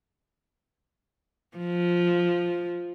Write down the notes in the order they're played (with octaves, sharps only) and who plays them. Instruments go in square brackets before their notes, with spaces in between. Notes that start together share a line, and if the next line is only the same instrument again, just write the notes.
[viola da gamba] F3